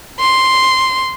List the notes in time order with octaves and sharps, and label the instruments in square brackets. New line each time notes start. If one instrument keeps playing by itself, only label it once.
[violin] C6